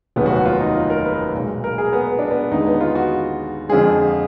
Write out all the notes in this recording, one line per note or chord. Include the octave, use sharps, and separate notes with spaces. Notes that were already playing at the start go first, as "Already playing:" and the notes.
F1 D#2 D#3 F#3 B3
F#4
F#4
F4
D#4
F4
A#4
B4
B1 A#2 G#3
A#4
G#4
B3
B3
D4
B3
D#2 D3 G#3 D#4
B3
F4
F#4
F2 D3 F3 G#3 G#4